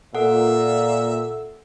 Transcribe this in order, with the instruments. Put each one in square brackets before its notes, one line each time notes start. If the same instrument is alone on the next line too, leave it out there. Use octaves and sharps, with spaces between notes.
[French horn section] A#2 [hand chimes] A4 F#5 [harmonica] E5